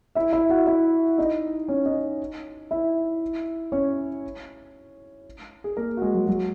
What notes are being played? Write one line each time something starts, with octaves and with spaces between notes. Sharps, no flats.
E4 E5
E4 E5
F#4 F#5
E4 E5
D#4 D#5
C#4 C#5
D#4 D#5
E4 E5
C#4 C#5
G#4
A#3 A#4
F#4
G#3 G#4
F#3 F#4
F#3 F#4